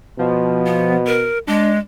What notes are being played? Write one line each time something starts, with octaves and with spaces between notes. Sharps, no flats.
B2 F3
B3
A#4
G#3 D4